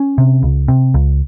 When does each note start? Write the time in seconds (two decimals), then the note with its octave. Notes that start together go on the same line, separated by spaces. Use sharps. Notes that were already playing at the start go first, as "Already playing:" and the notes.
Already playing: C#4
0.18 C3
0.43 C#2
0.68 C3
0.94 C#2